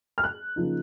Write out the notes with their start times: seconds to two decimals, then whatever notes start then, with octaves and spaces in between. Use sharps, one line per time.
0.18 F6
0.24 F#6
0.56 C#3 F3 A#3 D#4